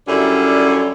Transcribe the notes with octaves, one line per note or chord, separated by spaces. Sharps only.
F#2 D3 G3 C#4 E4